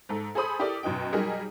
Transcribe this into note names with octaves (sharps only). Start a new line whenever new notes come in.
G#2 A4
G#4 A4 C5 B5 D#6
E4 G4 A4 A#4 D5
F#2 B2 D#4 G5
F#3 G3 D#4 G#4 A#4